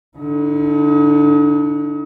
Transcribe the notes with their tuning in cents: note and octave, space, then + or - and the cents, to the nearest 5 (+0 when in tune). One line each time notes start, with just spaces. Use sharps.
D3 +0 D#4 +40